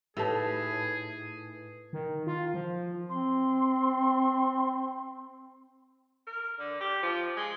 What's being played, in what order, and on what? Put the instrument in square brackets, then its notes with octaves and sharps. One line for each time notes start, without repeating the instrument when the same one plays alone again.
[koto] A2 [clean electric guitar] D#4 B4 [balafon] G4 A5 [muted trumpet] G#4
[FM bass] D#3
F4
F3
[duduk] C4 [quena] C6
[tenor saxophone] A#4
D3
G4
F3
G#3